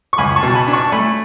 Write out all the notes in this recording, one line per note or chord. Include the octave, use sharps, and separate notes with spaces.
C#6
C#2 G#5 B5
A5 C#6
B2
A5
G#5 B5
D4
A5 C#6
A3 G#5 B5